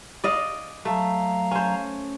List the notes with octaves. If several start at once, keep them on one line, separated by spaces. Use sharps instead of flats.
D5 D#5 F5
F#3 A3 F5 A#5
C#4 C5